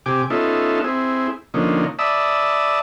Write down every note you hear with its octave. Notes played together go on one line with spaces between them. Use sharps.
C3 G4 G#5 D6
B3 C#4 D#4 F4 A4 E5
C4 E4 G#4
D3 F3 A#3 C#4 D#4
D5 E5 A5 B5 D#6 E6